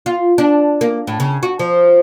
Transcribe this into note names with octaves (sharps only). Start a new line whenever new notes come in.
F4
D4
A#3
A2
C#3
F#4
F3